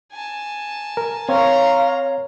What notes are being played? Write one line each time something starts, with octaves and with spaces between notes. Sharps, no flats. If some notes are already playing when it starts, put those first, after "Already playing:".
G#5 A5
A#4
C4 A#4 C#5 F5 A#5 C6